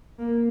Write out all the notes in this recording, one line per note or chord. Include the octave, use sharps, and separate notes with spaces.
A#3